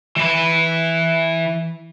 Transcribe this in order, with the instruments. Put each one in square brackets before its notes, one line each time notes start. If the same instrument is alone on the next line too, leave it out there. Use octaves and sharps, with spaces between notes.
[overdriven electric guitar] E3 B4